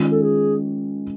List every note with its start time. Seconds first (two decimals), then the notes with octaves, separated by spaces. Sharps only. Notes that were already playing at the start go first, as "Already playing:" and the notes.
Already playing: D#3 G#3 C#4 F4
0.12 A4
0.22 G#4